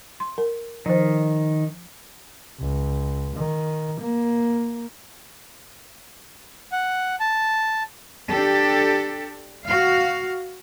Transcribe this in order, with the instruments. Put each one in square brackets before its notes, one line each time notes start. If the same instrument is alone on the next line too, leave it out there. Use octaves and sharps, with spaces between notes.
[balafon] C6
A#4
[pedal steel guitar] D#3 [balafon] F3 C5
[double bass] C#2
D#3
A#3
[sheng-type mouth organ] F#5
A5
[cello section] D4 G4 A4
F#4 F5